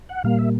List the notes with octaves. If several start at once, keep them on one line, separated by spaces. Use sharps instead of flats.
F#5
A#2 G3 A#3 F5
E5